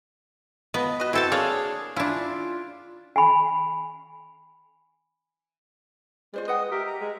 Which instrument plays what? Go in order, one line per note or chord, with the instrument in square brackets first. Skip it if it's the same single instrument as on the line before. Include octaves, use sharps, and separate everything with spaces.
[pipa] F3 [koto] B3 [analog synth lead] D#5
[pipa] F#4 B4 [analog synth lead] D#5
[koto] C4 A4 A5 [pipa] E4 G5 [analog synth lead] F#4
[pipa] A#3 D4 F5 [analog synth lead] G#4 [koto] C#5
[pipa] C#4 [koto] D4 E4 [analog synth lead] F4
[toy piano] G#5 B5
[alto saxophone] G#3 [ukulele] F4 C5 D5
[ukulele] B4 F#5 G5 [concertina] D#5 D#6
[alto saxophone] G4 [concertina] A#4 E5
[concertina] A#5
[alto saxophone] G#3